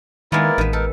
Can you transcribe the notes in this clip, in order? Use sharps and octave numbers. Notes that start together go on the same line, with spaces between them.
D#3 G#3 A#3 B3 E4 A#4 D5
A1 D#3 B4
D#4 A4 A#4